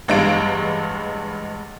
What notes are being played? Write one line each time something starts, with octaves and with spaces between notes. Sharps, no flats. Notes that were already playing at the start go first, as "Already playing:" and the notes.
A1 G2 G#3 F5 D7